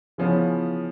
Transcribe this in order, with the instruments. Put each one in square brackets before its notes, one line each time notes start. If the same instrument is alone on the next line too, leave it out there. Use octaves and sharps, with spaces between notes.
[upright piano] C#3 E3 F3 B3 C#4